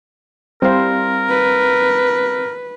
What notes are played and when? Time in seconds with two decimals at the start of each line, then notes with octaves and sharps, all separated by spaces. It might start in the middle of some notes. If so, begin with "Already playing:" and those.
0.62 G3 C4 E4 A#4 C5 F5
1.30 B4